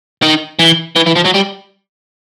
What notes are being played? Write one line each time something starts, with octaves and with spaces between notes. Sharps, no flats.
D#3
E3
E3
E3
F3
F#3
G3